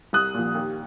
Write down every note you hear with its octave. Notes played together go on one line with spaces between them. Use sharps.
C2 D#6 F#6
A#2 F3
D#2